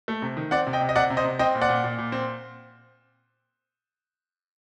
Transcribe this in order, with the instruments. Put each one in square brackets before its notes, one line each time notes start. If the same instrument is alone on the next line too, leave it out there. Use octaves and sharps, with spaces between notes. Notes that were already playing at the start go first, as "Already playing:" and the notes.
[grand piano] A3
C3
D#3
C4 D5 F#5
C3
D#5 G5
C3
D#5
C3 D5 F#5
C3
C5 D#5
C3
C4 D#5 G5
A#2
D5 F#5
A#2
A#2
A#2
C4